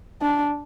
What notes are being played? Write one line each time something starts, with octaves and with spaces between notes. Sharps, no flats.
D4